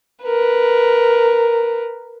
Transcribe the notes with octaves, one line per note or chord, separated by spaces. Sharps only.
A#4 B4